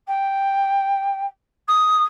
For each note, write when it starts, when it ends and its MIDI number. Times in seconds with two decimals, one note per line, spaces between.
0.07 1.25 79
1.68 2.02 87